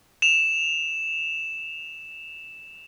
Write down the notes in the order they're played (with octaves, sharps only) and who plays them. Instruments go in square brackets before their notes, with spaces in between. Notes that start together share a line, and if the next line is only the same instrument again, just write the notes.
[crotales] E7 F7